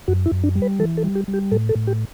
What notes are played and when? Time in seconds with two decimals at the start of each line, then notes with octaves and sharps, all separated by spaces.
0.08 F#2 F#4
0.26 E4
0.32 F#2
0.44 D4
0.55 G3
0.62 B4
0.79 E3 A4
0.97 A4
1.04 G3
1.15 G4
1.28 G3
1.34 G4
1.52 A2 A4
1.69 A4
1.76 A2
1.87 G4